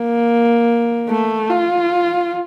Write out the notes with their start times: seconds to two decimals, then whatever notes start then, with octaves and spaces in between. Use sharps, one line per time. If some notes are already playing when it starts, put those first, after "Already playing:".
Already playing: A#3
1.10 A3
1.50 F4